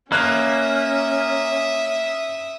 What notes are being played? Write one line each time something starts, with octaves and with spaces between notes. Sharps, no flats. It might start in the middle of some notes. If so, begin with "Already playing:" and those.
A#3 C#4 E5 D#6 F#6 G#6